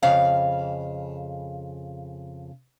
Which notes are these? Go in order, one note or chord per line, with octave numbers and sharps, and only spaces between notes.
F2 C#3 F5